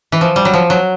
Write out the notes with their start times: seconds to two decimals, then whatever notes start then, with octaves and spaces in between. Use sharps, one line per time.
0.12 E3
0.21 F3
0.36 G3
0.45 F#3
0.53 F3
0.70 F#3